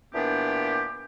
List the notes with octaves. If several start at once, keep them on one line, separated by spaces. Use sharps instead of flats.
A#2 E3 B3 D4 G4